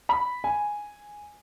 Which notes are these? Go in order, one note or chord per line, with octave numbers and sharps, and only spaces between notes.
B5
G#5